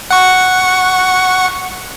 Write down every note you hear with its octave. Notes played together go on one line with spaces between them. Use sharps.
F#5 C#6